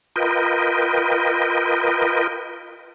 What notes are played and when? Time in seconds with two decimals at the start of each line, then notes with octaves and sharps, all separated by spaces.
0.16 F4 A#4 B4 D#5 G5